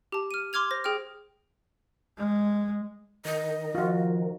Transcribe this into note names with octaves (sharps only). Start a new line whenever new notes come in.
G4 A5
F6 D#7
C6 D6 F6 G#6 F7
C5 A#6
G#4 G5 F6
G#3
D#3 D#5
F3 F4 F#4